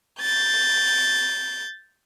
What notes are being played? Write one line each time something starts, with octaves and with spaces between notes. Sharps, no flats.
G6 A6